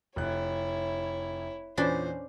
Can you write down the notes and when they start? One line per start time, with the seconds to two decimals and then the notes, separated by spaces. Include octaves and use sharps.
0.16 F1 E4 C#5 F#6
1.78 E2 A#2 C#4 D4 B4 C5